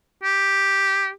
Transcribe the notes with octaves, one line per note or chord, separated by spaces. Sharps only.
G4